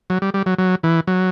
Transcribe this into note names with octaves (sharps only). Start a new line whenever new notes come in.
F#3
G3
G3
F#3
F#3
E3
F#3